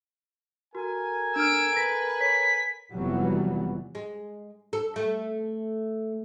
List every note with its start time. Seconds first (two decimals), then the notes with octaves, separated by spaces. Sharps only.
0.75 F#4 A4 A#4 G#5
1.36 D4 E6 F6 D7
1.76 B4 A#6 B6
2.20 C#5 B6
2.93 F1 E3 F#3 G3 B3
3.95 G#3
4.73 A4
4.96 A3